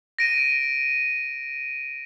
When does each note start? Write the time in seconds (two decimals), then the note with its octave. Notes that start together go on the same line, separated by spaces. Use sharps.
0.19 A#6 D7 D#7